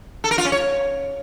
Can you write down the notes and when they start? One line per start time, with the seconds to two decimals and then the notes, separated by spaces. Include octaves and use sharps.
0.24 A4
0.31 A#4
0.38 F4
0.45 C#4
0.52 C#5